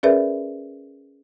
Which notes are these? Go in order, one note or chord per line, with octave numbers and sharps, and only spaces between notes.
C#4 G#4 A#4 B4 D5 E5